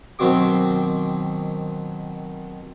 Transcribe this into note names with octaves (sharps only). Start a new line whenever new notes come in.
B2 D#3 F#3 C4 F#4 D6